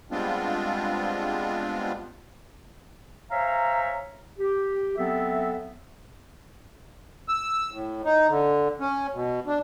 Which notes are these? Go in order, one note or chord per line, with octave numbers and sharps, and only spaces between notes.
G3 G#3 B3 C4 D4 F4
C5 C#5 E5 F5 G#5 A#5
G4
F#3 B3 C4 A4 E5
E6
A2
D#4
D3
C#4
B2
D4